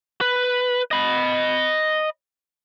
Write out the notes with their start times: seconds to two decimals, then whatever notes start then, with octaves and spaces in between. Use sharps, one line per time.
0.21 B4
0.91 D#5 B5